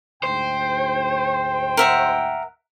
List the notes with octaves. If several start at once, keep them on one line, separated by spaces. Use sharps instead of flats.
D2 G#2 C5 G5
A#4 E5 F#5